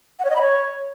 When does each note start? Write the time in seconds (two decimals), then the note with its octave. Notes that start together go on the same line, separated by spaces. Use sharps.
0.19 F#5
0.25 C#5
0.30 D#5
0.36 B5
0.41 C#5